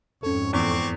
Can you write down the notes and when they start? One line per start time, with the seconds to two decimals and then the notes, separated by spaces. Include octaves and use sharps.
0.23 F2 G#2 C#4 A4 C#5
0.53 E2 C4 C#6 D6